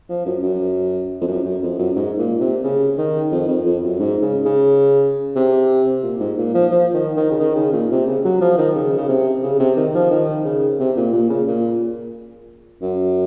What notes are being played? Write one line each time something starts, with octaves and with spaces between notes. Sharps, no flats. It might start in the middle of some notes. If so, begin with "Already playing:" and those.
F3
F#2
F#2
F2
F#2
F#2
F2
F#2
G#2
A#2
C3
C#3
D#3
F2
F2
F2
F#2
G#2
C#3
C#3
C3
A#2
G#2
A#2
F3
F3
D#3
D#3
C#3
D#3
C#3
A#2
C3
C#3
F#3
F3
D#3
C#3
C#3
C3
C#3
C3
D#3
F3
D#3
C#3
C3
A#2
A#2
C#3
A#2
F#2